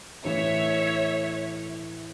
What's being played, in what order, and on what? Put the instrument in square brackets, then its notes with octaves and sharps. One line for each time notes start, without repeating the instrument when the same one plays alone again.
[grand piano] A2 E3 A3 [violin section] C#5 E5